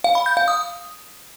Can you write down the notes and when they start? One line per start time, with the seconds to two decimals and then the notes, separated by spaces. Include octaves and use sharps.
0.04 F5
0.15 B5
0.26 G6
0.37 F5
0.48 D#6